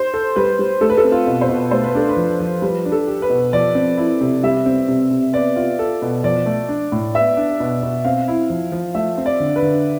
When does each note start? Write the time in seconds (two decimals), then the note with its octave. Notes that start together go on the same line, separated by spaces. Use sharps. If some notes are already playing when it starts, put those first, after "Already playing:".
Already playing: C5
0.14 A4
0.36 G3 B4
0.59 G3
0.81 A3 A4
0.90 B4
0.97 A4
1.04 C4
1.12 F4
1.27 B2
1.41 C5
1.49 B2
1.71 A3 C5
1.84 B4
1.95 D4 A4
2.09 B4
2.17 F3
2.40 F3
2.62 G3 B4
2.85 D4
2.92 A4
3.07 G4
3.22 B4
3.30 B2
3.53 F3 D5
3.75 C4
3.97 E4
4.21 C3
4.43 G3 E5
4.66 C4
4.88 C3
5.11 C3
5.33 B3 D5
5.56 F4
5.79 A4
6.02 B2
6.24 F3 D5
6.46 A3
6.69 D4
6.92 A2
7.14 B3 E5
7.37 D4
7.60 B2
7.83 B2
8.05 C4 F5
8.28 E4
8.50 F3
8.72 F3
8.95 A3 E5
9.18 C4
9.26 D5
9.40 D3
9.56 B4
9.62 D3